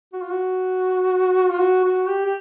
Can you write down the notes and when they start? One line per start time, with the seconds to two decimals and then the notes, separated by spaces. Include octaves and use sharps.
0.13 F#4
0.22 F4
0.31 F#4
1.50 F4
1.59 F#4
1.84 F#4
2.08 G4
2.24 G4